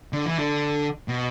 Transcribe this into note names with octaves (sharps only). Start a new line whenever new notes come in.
D3
E3
D3
B2